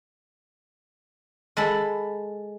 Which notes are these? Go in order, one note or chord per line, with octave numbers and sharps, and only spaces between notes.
G#3 A4 B5